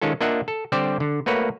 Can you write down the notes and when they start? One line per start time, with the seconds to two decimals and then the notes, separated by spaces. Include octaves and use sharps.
0.02 D#3 G#3 C#4 F4 A4
0.21 A#3 D4 F4 D#5 E5 F#5
0.48 A4
0.72 D3 G3 C4 G4 C5 D5
1.00 D3
1.26 A3 A#3 F#4 B4 C#5